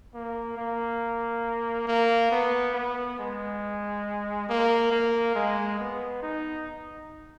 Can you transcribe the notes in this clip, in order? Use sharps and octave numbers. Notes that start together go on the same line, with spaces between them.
A#3
A#3
A#3
B3
B3
G#3
A#3
A#3
G#3
B3
D#4